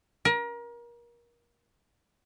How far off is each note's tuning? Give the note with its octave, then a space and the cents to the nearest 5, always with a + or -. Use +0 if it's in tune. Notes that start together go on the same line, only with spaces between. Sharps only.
A#4 +30